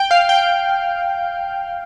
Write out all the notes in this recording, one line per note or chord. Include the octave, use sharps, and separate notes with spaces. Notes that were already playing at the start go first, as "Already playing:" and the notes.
Already playing: G5
F5
G5